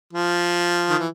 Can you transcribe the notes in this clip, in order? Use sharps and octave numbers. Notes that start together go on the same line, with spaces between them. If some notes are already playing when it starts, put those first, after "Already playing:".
F3
D#3
E3